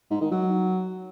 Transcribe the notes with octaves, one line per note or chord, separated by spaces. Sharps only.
G#2
D#3
F#3